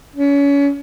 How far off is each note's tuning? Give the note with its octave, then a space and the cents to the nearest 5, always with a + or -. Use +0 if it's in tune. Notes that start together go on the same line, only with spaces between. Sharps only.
C#4 +30